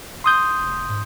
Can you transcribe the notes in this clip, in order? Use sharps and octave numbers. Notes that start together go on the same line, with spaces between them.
C6 D#6 G6
F1
G#2